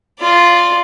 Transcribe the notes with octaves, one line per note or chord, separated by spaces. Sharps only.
F4 D5